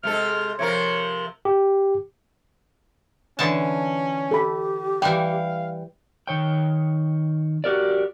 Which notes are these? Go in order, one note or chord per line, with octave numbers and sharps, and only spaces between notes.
C3 G#3 A4 F6
C3 F3 A#4 C#5
G4
D3 E3 C#4 A5
G4 A4 B5
E3 G3 F5 G5
D#3 C#5 G5
F#4 G4 A#4 D5